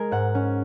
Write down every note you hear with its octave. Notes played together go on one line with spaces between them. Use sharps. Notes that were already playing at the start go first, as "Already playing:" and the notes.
Already playing: G#3 G#4 A#4
G#2 F#5
C#4